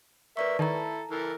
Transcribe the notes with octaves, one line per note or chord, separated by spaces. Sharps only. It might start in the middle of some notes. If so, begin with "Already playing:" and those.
A#4 B4 D5 E5 C#6
D#3 E4 A4 A5 A#5
E3 A4 A#4